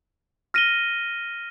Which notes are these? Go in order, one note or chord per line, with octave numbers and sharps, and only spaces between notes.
F6 A#6 D#7 G7